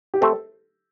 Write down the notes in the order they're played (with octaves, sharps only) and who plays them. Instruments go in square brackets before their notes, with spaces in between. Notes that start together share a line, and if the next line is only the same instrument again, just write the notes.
[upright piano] G4
[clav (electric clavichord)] A3 C4 [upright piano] A4